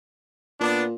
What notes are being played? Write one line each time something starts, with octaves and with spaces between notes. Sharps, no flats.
A#2 B3 D4